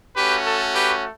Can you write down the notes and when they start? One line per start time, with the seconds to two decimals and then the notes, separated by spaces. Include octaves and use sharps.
0.16 A3 C#4 F#4 G4 B4
0.45 A4
0.73 G4 B4